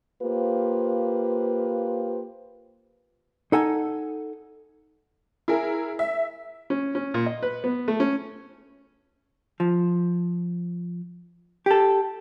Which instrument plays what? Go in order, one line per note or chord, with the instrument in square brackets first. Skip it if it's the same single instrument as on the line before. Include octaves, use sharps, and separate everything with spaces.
[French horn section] A#3 F4 G4 B4 C5
[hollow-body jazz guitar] D#4 A4 F#5 G#5
[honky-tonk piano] E4 G#4 A#4
E5
[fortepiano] C#4
C#4
A#2
D#5
B4
B3
A3
C#4
[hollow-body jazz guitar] F3
G4 A4